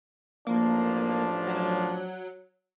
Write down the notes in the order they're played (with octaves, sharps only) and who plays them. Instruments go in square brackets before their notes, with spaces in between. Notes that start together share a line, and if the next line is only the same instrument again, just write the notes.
[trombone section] A1 F3 D4 [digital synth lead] A#3
[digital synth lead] F#3